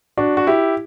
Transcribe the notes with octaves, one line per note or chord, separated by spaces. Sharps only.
D4 F#4
F#4
E4 G4